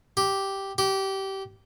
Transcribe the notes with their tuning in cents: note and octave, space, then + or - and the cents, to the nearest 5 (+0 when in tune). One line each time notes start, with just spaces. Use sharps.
G4 -5
G4 -20